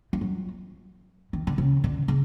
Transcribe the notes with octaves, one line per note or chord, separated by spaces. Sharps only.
F3
F#3
D#3
D3
C#3
D3
C#3